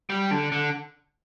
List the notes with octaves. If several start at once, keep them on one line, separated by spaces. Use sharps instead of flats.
G3
D3
D3